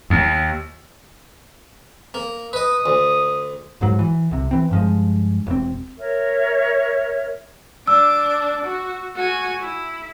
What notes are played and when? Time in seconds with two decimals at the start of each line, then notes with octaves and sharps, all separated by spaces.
0.10 D#2
2.14 A#3
2.53 B4 D#5 D#6
2.86 D2
3.81 D1 G#2 F#3
3.99 E3
4.31 C2 C3
4.51 E3 C4
4.71 G2 F3 G#3
5.47 E1 C4
5.98 A#4 C#5 E5
7.87 D4 D6 E6
8.65 F#4
9.15 F#4 G#5
9.61 E4